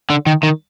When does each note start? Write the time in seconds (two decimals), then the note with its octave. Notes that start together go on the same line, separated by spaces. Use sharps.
0.10 D3
0.26 D#3
0.43 D#3